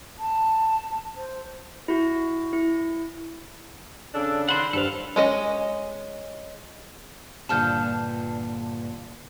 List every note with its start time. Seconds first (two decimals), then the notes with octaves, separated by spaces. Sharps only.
0.19 A5
1.16 C5
1.88 E4 F#4
2.53 E4
4.14 C#3 D4 A4
4.49 D#3 C5 F#5 B5
4.73 G2 A4 C5 F5
5.16 G#3 C#4 D#5
7.49 G2 A#2 D3 A5 F6 G6